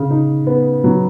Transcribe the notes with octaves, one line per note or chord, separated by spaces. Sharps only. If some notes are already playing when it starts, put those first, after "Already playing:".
Already playing: C#3
D#4
B3
F#3